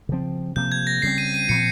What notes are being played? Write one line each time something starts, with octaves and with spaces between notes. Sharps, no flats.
C#3 F3 C4
C3 F3 A#3 G6
G#6
A#6
C#3 G3 C4 C7
D#7
D#7
A#2 F3 C4 C#7